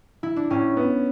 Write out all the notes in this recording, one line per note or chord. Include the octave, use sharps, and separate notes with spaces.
E4
D4
A2 C#4
B3